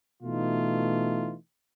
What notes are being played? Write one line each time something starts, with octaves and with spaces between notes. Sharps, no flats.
B2 E3 A3 D#4 F4